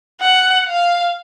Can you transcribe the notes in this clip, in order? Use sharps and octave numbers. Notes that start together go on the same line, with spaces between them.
F#5
F5